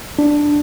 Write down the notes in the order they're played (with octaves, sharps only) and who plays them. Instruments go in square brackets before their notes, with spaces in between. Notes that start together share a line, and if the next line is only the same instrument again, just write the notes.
[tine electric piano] D4